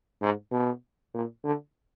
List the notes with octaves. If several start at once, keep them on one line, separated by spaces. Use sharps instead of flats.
G#2
B2
A#2
D3